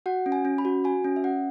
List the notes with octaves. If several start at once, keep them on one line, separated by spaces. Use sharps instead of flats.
F#4 F#5
C#4
G#5
C#4
B5
F#4
F#4 G#5
C#4
E5
C#4 F#5